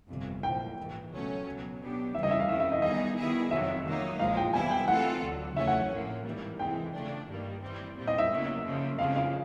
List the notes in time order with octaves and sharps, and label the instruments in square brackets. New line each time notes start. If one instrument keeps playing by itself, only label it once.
[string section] G1 F2 C3
[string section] A#1 A#2 F3 [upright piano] G5
[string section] A#1 G#2 E3
C#2 B2 F#3 A3 C#4
C#2 B2 F#3
B2 F#3 B3 D4 G4
[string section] D2 C#3 E3 G3 [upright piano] E5
[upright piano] D#5
E5
F5
[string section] F2 C#3 E3 A3 [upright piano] E5
[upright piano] E5
D#5
[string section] D#3 G3 B3 D#4 G#4 [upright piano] D#5
[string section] D#3 G3 B3 E4 G#4
[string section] F2 C3 D#3 F#3 [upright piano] E5
[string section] D#3 F#3 A#3 D#4
[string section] A#1 A#2 F3 G#3 [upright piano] F5
[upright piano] G5
[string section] C3 E3 G3 B3 E4 [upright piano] G#5
[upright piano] G5
[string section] E3 A3 C4 F4 A4 [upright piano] F#5
[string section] D2 D3 F#3
[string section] E2 C#3 F#3 A3 C#4 [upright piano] E5
[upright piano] F#5
[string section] A#1 A2 F3 A#3
G#1 G#2 E3 G3 A#3
[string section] C3 E3 G#3 C4 [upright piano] G5
[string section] C#3 F3 A3 D4
G2 D#3 G3 A#3
E3 G3 C4
C2 A#2 G3 C4
[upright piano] D#5
E5
[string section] E2 C#3 F#3 A#3
F#2 C#3 F3 A#3
[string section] F2 C#3 F3 G#3 [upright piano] F5
[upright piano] F5